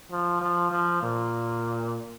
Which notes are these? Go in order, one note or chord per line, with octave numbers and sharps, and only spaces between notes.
F3
F3
F3
A#2